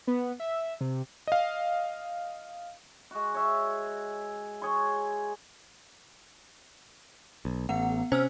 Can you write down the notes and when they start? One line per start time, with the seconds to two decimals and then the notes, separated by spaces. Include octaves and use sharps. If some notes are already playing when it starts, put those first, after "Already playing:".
0.07 B3
0.40 E5
0.81 C3
1.27 D#5 F5
3.11 G#3 F#4
3.34 C#5 E5
4.61 G#4 C#5 F#5 C6
7.45 B1
7.69 A1 B3 F#5
8.12 C3 C#4 C5 E6 F6